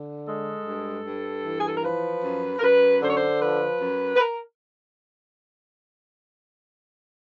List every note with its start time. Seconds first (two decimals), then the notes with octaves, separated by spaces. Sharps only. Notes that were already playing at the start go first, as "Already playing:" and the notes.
Already playing: D3
0.27 G#3 A4
0.66 G2
1.05 G2
1.45 E3
1.61 G#4
1.68 A4
1.76 A#4
1.84 F3 B4
2.24 F#2
2.59 A#4
2.62 F#2 B4
3.02 D3 C5
3.09 C#5
3.17 C5
3.41 F3 B4
3.81 F#2
4.16 B4
4.20 A#4